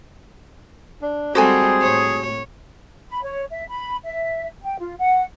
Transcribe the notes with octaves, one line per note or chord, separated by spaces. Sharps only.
D4
G3 G#3 C4 F#4 G#4 A4 C5 G#5
A2 C#5
B5
C#5
E5
B5
E5
G5
F4
F#5